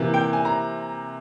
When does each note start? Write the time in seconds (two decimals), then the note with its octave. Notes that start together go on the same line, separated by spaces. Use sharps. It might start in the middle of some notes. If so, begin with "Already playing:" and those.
Already playing: C3 E3 A#3
0.14 G5
0.33 G#5
0.45 A#5